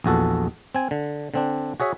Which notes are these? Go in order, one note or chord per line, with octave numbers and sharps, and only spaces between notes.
A#1 E2 F#4 A4
C4 G#5
D3
D3 C4 D4
F#4 G#4 C#5 E5